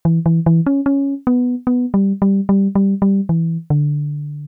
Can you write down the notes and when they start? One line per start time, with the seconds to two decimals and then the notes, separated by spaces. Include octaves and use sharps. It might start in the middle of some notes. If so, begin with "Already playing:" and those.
0.05 E3
0.26 E3
0.46 E3
0.66 C#4
0.86 C#4
1.27 B3
1.67 B3
1.94 G3
2.22 G3
2.49 G3
2.75 G3
3.02 G3
3.29 E3
3.70 D3